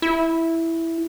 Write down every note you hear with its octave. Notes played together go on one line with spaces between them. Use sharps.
E4